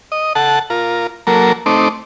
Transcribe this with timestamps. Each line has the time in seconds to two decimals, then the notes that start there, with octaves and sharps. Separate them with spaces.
0.12 D#5
0.35 A4 F#5 A5
0.70 F4 A#4
1.27 F#3 A#3 A4 A#4
1.66 A3 C4 D#4 D6